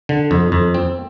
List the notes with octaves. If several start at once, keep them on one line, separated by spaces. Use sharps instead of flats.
D3
F2
F2
C4